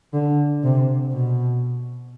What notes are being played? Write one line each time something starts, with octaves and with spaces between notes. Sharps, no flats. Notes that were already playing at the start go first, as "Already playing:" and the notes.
D3
C3
B2